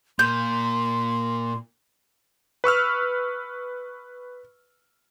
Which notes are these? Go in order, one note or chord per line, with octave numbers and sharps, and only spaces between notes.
A#2 C6 G6
B4 C#6 E6 F6